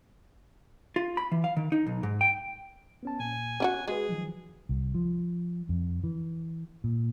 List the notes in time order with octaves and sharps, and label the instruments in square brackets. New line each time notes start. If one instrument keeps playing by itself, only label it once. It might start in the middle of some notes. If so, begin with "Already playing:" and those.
[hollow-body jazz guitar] F4
B5
E3
F5
D#3
D#4
B1
G#2
G5
[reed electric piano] B3 C#4 A5
[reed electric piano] A#2 [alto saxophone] G#5
[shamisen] C#4 E4 F#4 [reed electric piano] F#5 F#6
[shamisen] G#3 [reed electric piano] F#4 B4 [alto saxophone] G#4
[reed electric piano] D#3 F3 F#3
[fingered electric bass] C2
F3
F2
E3
A#2